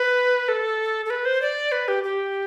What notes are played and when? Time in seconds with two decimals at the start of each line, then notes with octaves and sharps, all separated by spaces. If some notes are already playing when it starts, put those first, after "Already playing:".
Already playing: B4
0.48 A4
1.06 A4
1.10 B4
1.25 C5
1.42 D5
1.72 B4
1.88 G4
2.04 G4